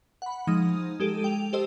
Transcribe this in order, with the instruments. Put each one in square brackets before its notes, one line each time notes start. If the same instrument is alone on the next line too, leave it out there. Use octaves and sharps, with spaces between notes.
[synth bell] F#5 B5
F3 G#3 D#4 D#6
G#3 G4 A4 D7 D#7
G5 F7
G4 A4 C5 D#5 E6